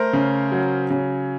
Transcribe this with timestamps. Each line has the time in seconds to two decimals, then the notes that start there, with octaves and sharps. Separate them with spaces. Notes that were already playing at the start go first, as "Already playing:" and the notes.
Already playing: A3 A#4 C5
0.13 C#3
0.52 F#3
0.90 C#3